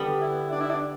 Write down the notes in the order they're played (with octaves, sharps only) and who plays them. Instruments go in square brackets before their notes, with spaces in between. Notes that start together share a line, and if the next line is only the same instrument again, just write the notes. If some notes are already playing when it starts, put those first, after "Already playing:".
Already playing: [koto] D3 G3 B3
[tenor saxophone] E4
D4
E4
D4